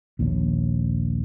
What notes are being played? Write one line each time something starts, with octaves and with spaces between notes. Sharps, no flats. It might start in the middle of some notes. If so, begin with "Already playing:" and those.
A#1 D#2